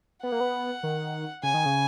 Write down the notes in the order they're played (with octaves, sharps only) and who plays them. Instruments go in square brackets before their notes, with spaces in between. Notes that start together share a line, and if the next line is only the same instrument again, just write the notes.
[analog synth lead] B3 [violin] F#5
[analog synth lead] A#3
B3
D#3
[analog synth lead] C#3 [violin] G#5
[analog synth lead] D#3
C#3